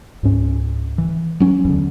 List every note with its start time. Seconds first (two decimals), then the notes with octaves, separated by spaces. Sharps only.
0.23 C#2 G#2 C#4
0.98 E3
1.40 F#3 C#4
1.65 E2 D3